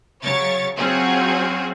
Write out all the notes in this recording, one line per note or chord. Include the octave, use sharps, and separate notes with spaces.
C#3 F#3 C#5 C#6 A6
F#3 C4 C#4 F4 F#4 G#4